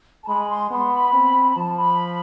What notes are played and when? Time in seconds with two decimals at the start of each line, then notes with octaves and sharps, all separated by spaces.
0.24 A5
0.28 G#3 B5
0.50 C6
0.71 B3 C6
0.93 B5
1.13 C4
1.51 B5
1.55 F3 A5
1.77 B5